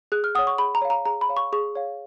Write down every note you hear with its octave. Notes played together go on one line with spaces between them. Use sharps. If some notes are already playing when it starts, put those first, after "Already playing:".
G#4 F#6
F6
C#5 F#5 D#6
C#6
G#4 B5
A#5
C#5 F5
A#5
G#4 A#5
B5
C#5 F5
C#6
G#4 C#6
C#5 F5